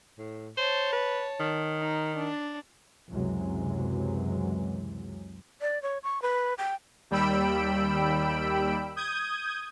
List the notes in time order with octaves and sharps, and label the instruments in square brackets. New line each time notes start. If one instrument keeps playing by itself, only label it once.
[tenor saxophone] A2
[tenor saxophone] C5 [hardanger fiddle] C#5 A5
[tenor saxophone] B4
D#3
[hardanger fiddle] D#4
D4
[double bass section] C#2 F#2 C3 E3 F#3 G#3
[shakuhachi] D5
C#5
C#6
B4
G5
[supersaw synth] D#2 G3 G5 B5 E6 D7
D#6 G6 G#6 D#7